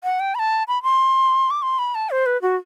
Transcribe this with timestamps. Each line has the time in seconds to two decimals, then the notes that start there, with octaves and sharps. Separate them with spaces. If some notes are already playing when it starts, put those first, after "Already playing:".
0.04 F#5
0.20 G5
0.35 B5
0.39 A5
0.68 B5
0.83 C6
1.51 D6
1.62 C6
1.79 B5
1.95 A5
2.10 C5
2.26 B4
2.42 F#4